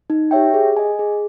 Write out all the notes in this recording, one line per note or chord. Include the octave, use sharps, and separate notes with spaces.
D#4
G4 C#5 E5 G5
G#4
D#5 G#5
G#4